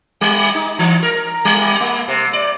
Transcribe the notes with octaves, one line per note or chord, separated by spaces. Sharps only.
G3
D#4
E3
A#4
G3
A#3
C3
D5